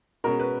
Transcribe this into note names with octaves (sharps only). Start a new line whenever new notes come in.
B2 G#3 C#4 A#4
B4